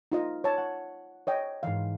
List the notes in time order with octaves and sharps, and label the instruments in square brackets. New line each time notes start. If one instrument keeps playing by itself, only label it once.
[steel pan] D#4 F4 D#5
C#5 A5
[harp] F#5
[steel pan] C#5 D#5 G5
[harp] G#2 E3 [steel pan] F5